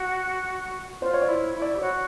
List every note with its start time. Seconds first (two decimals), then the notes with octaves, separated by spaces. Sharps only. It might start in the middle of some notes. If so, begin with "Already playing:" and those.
Already playing: F#4
1.01 F4 C5
1.13 C#5
1.21 D5
1.28 E4
1.55 E4
1.62 D5
1.76 G4
1.81 F#4 C#5